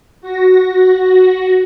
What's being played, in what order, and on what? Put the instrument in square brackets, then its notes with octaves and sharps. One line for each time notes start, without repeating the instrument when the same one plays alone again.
[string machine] F#4 A#6